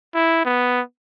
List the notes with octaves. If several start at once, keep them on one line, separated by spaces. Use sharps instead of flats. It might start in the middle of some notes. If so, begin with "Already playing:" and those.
E4
B3